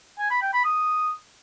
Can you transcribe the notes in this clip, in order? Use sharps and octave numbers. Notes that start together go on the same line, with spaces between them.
G#5
B5
G5
B5
D#6